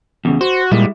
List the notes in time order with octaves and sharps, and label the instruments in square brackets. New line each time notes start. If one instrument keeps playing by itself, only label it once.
[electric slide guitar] E2 C#3
[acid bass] F#4 [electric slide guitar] C5
[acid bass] A#2 [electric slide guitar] G3 G#3 E4